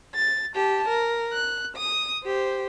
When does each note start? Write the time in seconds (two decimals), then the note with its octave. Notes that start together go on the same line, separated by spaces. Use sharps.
0.15 A6
0.55 G4 A5
0.88 A#4
1.33 F#6
1.77 D#6
2.24 G4 C5